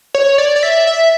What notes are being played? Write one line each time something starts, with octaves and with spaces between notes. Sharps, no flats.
C#5
D5
D5
E5
E5